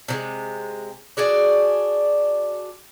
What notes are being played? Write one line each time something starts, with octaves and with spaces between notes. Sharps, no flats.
C3 F3 G#3
D4 F#4 G#4 D5